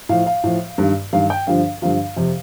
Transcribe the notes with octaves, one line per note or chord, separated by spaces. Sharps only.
A2 F3 F5
F5
A2 F3
G2 D#3
G2 D#3 F5
G5
G2 D3 F3 F5
G2 D3 F3 F5
F2 C3 F3